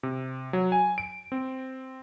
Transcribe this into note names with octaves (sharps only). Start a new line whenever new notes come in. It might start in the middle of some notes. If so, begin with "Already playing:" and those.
C3
F#3
G#5
D7
C4